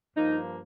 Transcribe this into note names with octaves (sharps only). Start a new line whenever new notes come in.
G2 F3 A#3 D#4